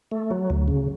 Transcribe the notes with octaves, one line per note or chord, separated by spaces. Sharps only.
A3
F#3
D2
C#3